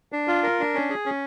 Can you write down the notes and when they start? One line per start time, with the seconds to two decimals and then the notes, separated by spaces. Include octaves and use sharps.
0.12 D4
0.28 F4
0.43 A#4
0.60 D4
0.74 C#4
0.90 G#4
1.06 C#4